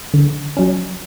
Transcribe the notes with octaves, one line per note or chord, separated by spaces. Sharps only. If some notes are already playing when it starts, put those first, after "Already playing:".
D3
F#3 C#4